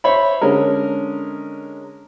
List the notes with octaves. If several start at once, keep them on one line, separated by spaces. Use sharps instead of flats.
C5 C#5 E5 B5
D3 G#3 C#4 A#4